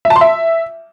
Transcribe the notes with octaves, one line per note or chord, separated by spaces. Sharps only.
E5
A5
C6
E5